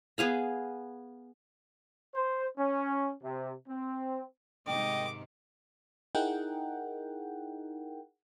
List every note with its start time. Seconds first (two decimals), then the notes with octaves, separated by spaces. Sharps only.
0.18 B3 G#4 F5 B5
2.14 C5
2.58 C#4
3.23 C3
3.69 C4
4.67 G#2 C3 D#3 D#5 G5 D6
6.15 D#4 E4 G#4 A#4 F#5 G5